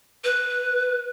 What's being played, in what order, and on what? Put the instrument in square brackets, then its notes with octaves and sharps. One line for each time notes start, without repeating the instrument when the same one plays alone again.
[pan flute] B4